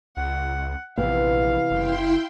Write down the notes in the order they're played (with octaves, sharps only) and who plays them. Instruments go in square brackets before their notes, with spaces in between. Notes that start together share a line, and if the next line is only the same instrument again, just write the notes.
[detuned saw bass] C#2 [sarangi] F#5
[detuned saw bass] A#1 [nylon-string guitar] C3 E3 B3 [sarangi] F5
[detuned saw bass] F#1 [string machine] E4 G5 C6